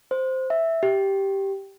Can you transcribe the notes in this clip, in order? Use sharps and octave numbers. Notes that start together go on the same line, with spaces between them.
C5
E5
G4